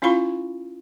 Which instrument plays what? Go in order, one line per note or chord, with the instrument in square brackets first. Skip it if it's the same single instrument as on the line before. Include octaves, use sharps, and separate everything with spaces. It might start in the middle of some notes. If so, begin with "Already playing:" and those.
[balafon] C#4 E4 F4 F5 B5 C#6